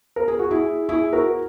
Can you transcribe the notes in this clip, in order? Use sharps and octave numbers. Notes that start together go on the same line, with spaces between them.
A#4
G#4
F#4
E4 G#4
E4 G#4
F#4 A#4